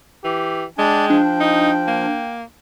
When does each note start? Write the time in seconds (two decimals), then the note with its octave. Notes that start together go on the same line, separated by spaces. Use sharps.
0.24 E3 G4
0.78 G#3 D4 G5
1.10 F3 D4
1.40 D#4
1.87 A#3